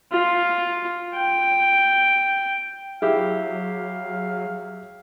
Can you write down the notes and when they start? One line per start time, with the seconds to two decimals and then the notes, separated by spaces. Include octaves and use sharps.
0.12 F4
1.15 G5
3.02 F#3 E4 G4 G#4 F5